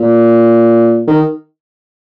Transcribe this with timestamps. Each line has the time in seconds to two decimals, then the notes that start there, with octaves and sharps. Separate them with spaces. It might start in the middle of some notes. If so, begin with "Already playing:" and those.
Already playing: A#2
1.07 D#3